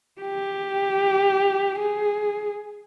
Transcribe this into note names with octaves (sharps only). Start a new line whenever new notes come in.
G4
G#4